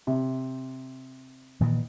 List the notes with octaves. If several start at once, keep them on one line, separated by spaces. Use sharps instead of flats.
C3
A#2 D#3 E3